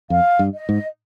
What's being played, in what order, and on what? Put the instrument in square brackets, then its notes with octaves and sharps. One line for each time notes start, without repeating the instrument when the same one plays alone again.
[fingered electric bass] F2 [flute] F5
[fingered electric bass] G2
[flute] D#5
[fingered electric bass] G#2